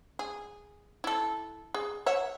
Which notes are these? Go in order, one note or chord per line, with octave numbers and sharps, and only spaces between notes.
G#4
E4 A4
G#4
C#5 E5 F#5